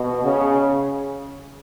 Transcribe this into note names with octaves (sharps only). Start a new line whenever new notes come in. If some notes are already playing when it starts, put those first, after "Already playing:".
Already playing: B2
C#3